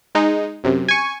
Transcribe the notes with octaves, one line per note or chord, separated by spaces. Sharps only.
G#3 D#4
F#2 C3
G#5 C#6